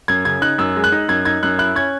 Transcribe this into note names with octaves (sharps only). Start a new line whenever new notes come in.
F#2 G#6
C#3 G#6
D#4 F#6
F#2 E6
G#3
F#6
D#4
F#2 G#6
D#4 G#6
F#2 F#6
E4 F#6
C#4 G#6